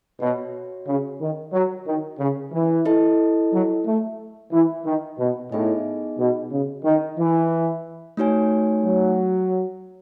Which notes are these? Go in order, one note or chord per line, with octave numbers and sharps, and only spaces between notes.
B2 F#4 C#5 E5
C#3
D#3
F#3
D#3
C#3
E3
E4 A4 D#5 A5
F#3
A3
E3
D#3
B2
A2 B3 D#4 G#4 D#5 G#5
B2
C#3
D#3
E3
A3 D#4 F#4 C#5 G#5
F#3